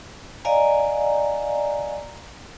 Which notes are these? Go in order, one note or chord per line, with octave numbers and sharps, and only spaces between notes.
D5 D#5 F5 G#5 A#5